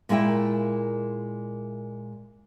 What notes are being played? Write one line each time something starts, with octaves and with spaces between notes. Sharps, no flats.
A#2 G#3 A#3 E4 G5